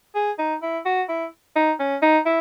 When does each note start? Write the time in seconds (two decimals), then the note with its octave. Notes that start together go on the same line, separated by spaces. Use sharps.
0.15 G#4
0.39 D#4
0.62 E4
0.85 F#4
1.09 E4
1.56 D#4
1.79 C#4
2.02 D#4
2.26 E4